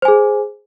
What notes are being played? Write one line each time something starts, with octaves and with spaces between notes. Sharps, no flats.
G#4 C5 G#5